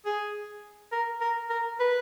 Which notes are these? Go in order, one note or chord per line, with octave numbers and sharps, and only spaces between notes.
G#4
A#4
A#4
A#4
B4